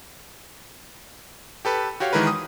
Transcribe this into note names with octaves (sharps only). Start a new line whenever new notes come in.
G4 A4 B4
F#4 G4 C#5 F5
D#3 E3 G#3 E4 A#4 B4
D#6